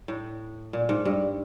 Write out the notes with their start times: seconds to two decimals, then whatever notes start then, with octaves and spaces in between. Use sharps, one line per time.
0.08 A2
0.73 A#2
0.89 G#2
1.05 G2